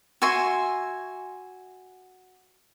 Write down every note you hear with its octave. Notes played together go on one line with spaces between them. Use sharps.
F#4 E5 G#5 C6